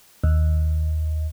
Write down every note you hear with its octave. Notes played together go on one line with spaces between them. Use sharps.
D#2